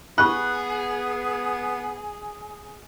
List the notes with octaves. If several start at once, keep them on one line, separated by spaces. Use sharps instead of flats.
B3 G#4 B5 C#6 F#6